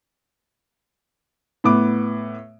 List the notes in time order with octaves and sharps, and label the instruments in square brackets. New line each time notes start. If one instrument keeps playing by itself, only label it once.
[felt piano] A2 B3 D6